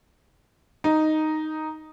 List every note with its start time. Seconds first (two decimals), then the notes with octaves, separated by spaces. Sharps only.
0.84 D#4